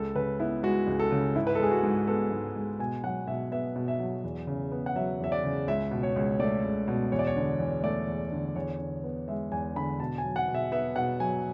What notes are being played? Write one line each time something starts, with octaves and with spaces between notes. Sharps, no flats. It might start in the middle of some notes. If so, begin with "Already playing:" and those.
Already playing: C#2 A4
C#3 B4
B3 E4
G#3 F#4
C#2
A4
C#3
G#2 E4
B4
A4
G#3 G#4
F#4
G#2
B3 A4
G#2
G#3
B2 G#5
F#3 F#5
B2 E5
B3 E5
B2
E5
F#3
E2
C#3
B3
F#5
F#3 E5
E2 E5
D5
C#3
C#2 E5
B2
C#5
C#2
A3 D5
C#2
B2
E2 C#5
D5
C#5
D3
E2
A3 D5
E2
D3
E2 C#5
D3
B3
G#3 E5
E2 G#5
D3 B5
B2 A5
G#5
F#3
F#5
B2
E5
B3 E5
B2 F#5
F#3 G#5